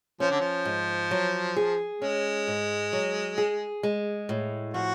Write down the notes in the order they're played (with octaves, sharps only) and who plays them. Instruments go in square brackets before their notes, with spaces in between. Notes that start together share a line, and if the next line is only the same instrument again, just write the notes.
[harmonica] F3 [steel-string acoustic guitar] C#4
[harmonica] D3
F3
[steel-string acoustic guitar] G#2
F#3
G#4
[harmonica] G#3 [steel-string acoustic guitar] C#4
[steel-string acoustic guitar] G#2
F#3
G#4
G#3
A2
[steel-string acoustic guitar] F3 [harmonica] F#4